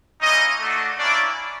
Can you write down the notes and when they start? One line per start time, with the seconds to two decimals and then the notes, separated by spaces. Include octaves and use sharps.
0.21 A#3 C#4 D#4 E4 D#5
0.60 A3 D4 F#4
0.98 A#3 C#4 D4 E4 D5